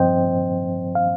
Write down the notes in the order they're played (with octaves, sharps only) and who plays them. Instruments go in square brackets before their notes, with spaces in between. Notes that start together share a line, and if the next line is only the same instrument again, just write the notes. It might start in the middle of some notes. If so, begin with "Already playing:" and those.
Already playing: [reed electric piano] G2 F3 C4 C5 D#5 G5
F5